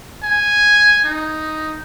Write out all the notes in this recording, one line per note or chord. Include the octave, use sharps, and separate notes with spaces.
G#5
D#4